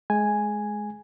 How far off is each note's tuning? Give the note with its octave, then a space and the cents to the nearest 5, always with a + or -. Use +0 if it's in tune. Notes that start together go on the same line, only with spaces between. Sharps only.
G#3 +20 G#5 +0